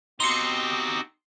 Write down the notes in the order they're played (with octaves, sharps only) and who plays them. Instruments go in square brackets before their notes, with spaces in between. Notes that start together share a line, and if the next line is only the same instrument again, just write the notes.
[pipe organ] B3 C4 F#4 [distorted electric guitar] D#4 G4 [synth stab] C6 C#7